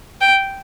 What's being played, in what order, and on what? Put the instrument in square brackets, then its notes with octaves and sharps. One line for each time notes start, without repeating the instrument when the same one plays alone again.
[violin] G5